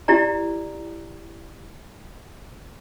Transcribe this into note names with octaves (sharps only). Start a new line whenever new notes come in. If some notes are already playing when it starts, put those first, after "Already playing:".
E4 G4 D5 A#5